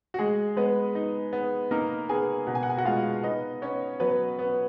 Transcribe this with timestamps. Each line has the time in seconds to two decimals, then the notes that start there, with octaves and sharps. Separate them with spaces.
0.14 F#4
0.19 G#3 G#4
0.56 G#3 B3 B4
0.95 D#4
1.33 B3
1.71 A#3 D#4 A#4
2.09 B3 G#4 G#5
2.47 B2 F#5
2.55 G#5
2.63 F#5
2.70 G#5
2.77 F#4 F#5
2.85 G#3 F4 F5
3.23 B3 D#4 D#5
3.62 B3 C#4 C#5
4.00 F#3 B3 B4
4.39 B3